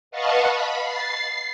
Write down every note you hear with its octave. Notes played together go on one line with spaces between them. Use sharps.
B4 D#5 F5 F#5 A5 C#6
B5
A6 C7
C7